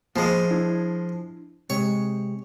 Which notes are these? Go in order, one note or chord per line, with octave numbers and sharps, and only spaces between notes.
F3 G#3 A#3 A5 B5
D4 E4
C3 G#3 C#5